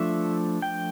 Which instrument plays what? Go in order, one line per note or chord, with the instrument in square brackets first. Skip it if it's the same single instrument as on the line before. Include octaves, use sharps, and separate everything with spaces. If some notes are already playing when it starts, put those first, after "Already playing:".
Already playing: [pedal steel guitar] F3 A3 D4 E5
G5